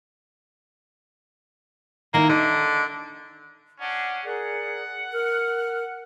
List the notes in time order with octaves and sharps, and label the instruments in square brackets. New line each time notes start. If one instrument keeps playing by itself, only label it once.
[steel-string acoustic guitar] D#3 E4 [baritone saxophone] A#3
[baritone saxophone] D3 [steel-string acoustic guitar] D#5
[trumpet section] C#4 D4 [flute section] F#5
[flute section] G#4 A#4 D5 [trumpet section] F#5
[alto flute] A#4 [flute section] F6